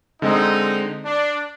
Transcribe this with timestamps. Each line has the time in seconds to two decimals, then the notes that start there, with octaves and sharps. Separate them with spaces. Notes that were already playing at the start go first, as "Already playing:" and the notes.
0.22 D3 G#3 C4 D#4
1.05 D4